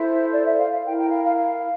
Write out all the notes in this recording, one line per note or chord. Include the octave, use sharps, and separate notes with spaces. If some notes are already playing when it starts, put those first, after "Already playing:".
Already playing: E4 A4 C5 E5
D5
E5
F5
F5
E4 A#4 G5
G5
F5
F5
F5